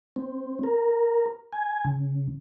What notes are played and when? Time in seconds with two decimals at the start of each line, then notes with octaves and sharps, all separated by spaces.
0.16 C4
0.63 A#4
1.53 G#5
1.85 C#3